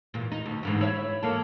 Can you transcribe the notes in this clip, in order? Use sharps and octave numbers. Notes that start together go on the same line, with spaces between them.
E2 A#2
D#4
D2
G#2 D3 E3
E4 C#5 E5
E2 A#3 A4